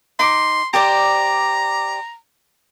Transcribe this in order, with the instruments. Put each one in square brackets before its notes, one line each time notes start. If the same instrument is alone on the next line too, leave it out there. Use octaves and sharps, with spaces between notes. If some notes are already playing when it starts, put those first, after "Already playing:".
[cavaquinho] D#4 D6 [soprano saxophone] C6
[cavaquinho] G4 C5 D5 [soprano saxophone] A#5